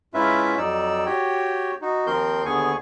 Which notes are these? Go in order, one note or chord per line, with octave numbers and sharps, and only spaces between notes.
G#2 C#4 E4 F4 B4 E5
F2 F#3 D#4 D5 E6
F#4 G4 C#5 G5
D#4 F#4
D#2 F3 C4 A#4 C6 G6
D#2 D3 B3 G#4 G#5 C#6